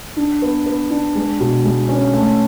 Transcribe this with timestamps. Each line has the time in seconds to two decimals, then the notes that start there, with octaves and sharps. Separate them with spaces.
0.17 D4
0.42 B3
0.66 B3
0.91 D4
1.15 G#3
1.40 B2
1.65 G#3
1.89 C#4
2.14 A3